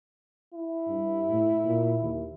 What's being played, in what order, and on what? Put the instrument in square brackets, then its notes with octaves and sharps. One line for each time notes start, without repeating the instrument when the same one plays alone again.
[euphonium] E4
[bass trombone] G2
A2
A#2
D#2